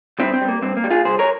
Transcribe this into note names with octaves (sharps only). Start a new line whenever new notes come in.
G2 C4 E4
C4
G3
A#3
G2 C4
A#3
G3
F4 G#4
C2 G#4 C5
A#4 C#5